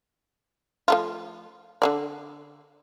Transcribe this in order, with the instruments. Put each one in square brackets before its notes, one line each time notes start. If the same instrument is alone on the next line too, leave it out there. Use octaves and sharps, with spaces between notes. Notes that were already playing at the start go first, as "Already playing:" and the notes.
[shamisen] F3 A3 F4
D3 A#3 D5